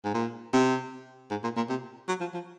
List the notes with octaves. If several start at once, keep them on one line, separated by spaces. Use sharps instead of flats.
G#2
A#2
C3
G#2
A#2
A#2
C3
F#3
F3
F3